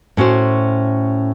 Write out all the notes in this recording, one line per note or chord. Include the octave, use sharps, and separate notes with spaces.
A2 C#4 F#4 C5